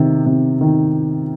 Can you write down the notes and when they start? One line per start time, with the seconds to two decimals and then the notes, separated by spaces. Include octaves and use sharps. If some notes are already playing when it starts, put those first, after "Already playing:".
Already playing: C3 D#3
0.26 C3
0.61 D#3